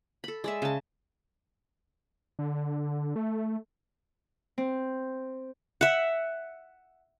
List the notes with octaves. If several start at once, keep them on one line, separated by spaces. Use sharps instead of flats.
A4 B5
G#3 D5 E5
C#3 A5
D3
A3
C4
E5 F#5